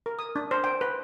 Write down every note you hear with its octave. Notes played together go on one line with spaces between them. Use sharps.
A#4
D#6
D4
C5
G5
B4